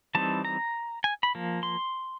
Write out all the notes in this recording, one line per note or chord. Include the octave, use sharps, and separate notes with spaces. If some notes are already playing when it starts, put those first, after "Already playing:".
E3 G3 C4 D#4 A5
A#5
G#5
B5
F3 A#3
C6